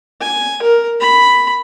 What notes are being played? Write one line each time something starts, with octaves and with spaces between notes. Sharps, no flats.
G#5
A#4
B5